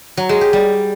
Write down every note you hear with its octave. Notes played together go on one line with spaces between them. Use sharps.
F#3
G#3
G4
G3